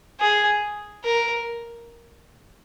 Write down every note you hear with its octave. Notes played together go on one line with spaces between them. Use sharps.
G#4
A#4